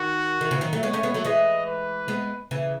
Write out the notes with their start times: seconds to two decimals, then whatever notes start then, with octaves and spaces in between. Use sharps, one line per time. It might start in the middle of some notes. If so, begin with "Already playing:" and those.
Already playing: D#3 F#4
0.41 D#3
0.51 C#3 E3
0.61 D#3 F#3
0.73 F#3 A3
0.83 G#3 B3 C#5
0.93 A3 C#4
1.03 G#3 B3
1.14 F#3 A3
1.25 E3 G#3 D#5
1.67 B4
2.08 G#3 B3
2.51 C#3 E3